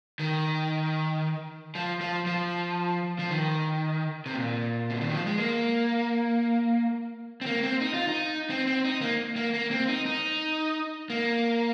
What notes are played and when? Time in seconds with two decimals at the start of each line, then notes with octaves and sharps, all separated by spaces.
0.19 D#3
1.75 F3
2.01 F3
2.26 F3
3.19 F3
3.31 D#3
4.26 C3
4.34 A#2
4.90 C3
5.01 D#3
5.14 F3
5.26 G#3
5.39 A#3
7.41 C4
7.46 A#3
7.63 C4
7.80 D#4
7.94 F4
8.07 D#4
8.50 C4
8.67 C4
8.85 D#4
9.01 A#3
9.36 A#3
9.54 A#3
9.71 C4
9.88 D#4
10.06 D#4
11.10 A#3